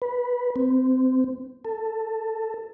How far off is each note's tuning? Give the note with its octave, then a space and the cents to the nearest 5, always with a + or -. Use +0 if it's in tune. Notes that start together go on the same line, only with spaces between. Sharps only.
B4 -10
C4 -20
A4 +15